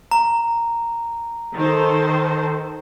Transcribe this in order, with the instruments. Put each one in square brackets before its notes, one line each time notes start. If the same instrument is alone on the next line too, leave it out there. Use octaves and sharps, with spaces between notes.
[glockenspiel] A#5
[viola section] D#3 A4 C5